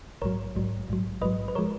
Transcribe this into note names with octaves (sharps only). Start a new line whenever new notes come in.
A#1 G#2 F#3 A#4 C#5
A#1 G#2 F#3
A#1 G#2 F#3
A#1 G#2 F#3 B4 D#5
B4
F3 G#3 A#4 C#5